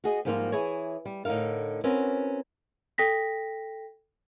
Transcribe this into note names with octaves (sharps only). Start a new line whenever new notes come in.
F#4 G#4 D#5
G#2 F3 G3 A#3 D#4 F4
E3 E4 G#4 C#5
G3
A2 D3 D#4 A#4 F5
C4 C#4 F#4 A#4 B4
A4 G5 A#6 B6